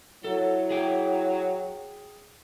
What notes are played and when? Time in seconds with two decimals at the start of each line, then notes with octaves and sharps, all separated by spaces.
0.24 F#3 E4 A4
0.71 G#4 G5